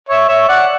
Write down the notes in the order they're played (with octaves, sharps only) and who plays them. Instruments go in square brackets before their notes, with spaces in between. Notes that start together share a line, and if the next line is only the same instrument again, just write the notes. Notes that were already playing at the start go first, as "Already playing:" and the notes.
[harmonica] C#5 E5
C#5 E5
D5 F#5